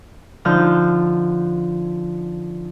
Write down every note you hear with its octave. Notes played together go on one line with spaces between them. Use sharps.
D3 F3 D#4 F6 G6